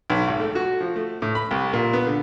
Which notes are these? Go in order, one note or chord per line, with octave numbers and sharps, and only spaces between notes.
B1
G#1
A3
F#4
F3
A3
A2
B5
C2
A#2
B3
D3